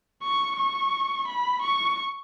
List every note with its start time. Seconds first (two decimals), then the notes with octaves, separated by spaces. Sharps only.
0.22 C#6
0.57 C#6
1.28 B5
1.62 C#6